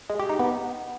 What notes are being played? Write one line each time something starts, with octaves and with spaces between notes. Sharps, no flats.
G#3
G4
D#4
B3